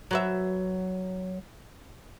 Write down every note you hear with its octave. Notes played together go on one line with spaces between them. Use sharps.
F#3 B4 E5